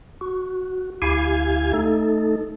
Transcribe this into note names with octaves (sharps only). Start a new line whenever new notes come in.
F#4
D2 E4 G4 F5 G#5 G#6
A3 D#4 A4